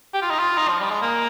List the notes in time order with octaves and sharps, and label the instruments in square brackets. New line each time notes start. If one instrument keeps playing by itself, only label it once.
[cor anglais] G4
F4
D#4
F4
D#4
F3
G3
G#3
A#3